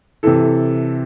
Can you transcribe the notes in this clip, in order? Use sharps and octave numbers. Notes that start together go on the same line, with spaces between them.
C3 E3 A4